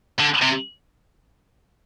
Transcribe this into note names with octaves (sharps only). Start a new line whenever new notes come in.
D3
C3